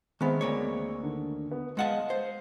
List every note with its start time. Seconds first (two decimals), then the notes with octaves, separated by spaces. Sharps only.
0.21 D#3 G#3 B3 C4 E5
0.41 D2 A#3 C#5
1.03 D3 D#3
1.52 B3
1.77 G#3 D#5 F5 F#5 A5
2.10 C5